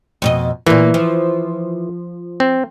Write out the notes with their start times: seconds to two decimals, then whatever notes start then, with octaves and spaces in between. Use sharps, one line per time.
0.22 F2 B2 D#5
0.67 A#2 E3 A#3
0.94 F3
2.40 C4